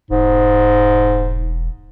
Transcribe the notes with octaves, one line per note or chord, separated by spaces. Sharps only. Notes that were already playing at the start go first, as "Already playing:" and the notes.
E1 G#2